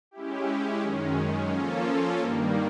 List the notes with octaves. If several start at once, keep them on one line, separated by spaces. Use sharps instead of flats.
G#3 C#4 E4 G4
F#2 D#3 G#3 C#4
F3 A#3 C#4 F4 A4
G2 D#3 G3 A#3